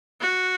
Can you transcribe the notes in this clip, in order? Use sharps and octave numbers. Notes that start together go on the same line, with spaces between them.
F#4